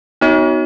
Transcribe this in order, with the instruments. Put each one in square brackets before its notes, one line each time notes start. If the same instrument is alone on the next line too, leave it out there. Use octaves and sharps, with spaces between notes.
[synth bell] B3 D#4 F#4 C#5